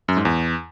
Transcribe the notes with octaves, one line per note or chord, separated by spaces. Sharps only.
F#2
G#2
E2